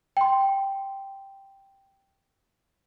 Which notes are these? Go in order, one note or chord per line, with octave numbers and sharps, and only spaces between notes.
G5 C6